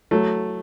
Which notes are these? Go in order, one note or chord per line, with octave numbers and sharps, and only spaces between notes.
F#3 A3